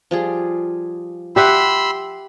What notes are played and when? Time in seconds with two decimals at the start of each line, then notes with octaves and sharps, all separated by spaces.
0.11 F3 G3 G#4
1.36 G4 E5 F#5 B5 C6 E6